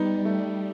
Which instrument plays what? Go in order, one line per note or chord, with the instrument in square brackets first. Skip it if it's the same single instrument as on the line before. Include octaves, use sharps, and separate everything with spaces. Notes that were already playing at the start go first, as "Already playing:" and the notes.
Already playing: [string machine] G3 [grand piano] B3 D#4
[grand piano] A3